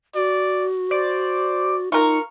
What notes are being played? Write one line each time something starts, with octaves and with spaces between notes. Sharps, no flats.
F#4 D5
C5 D5
D#4 F4 A#4 C#6